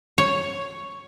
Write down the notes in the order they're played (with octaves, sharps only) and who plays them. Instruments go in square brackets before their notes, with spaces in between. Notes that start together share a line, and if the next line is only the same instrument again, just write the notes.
[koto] C#5